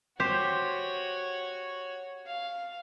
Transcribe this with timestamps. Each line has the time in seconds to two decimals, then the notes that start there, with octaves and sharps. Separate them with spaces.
0.20 F#4 G4 C5 C#5
2.26 F5